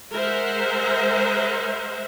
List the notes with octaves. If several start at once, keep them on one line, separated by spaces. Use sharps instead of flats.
G#3 A#4 C5 E5 F#5